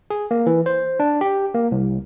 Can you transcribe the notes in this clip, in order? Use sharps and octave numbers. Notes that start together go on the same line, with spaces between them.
G#4
A#3
E3
C5
D4
G4
A#3
C2